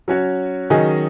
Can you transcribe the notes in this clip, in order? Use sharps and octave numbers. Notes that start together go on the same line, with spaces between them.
F#3 C#4 F#4 C#5
D#3 F#3 C#4 G#4 D#5